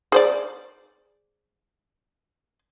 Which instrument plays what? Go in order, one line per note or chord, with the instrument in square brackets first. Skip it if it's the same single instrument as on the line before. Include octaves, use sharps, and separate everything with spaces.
[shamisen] G#4 C5 D5